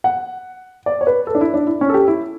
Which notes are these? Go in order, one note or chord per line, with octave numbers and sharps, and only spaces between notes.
F#5
D5
C#5
B4
A4
D4
E4
D4
E4
C#4
A4
G4
E4